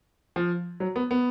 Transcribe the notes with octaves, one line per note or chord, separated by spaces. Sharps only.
F3
F#3
B3
B3